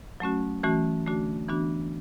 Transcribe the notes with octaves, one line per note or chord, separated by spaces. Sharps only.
F#3 A3 C#4 F#4
E3 A3 C#4 F#4
D3 A3 D4 F#4
E3 B3 D4 F#4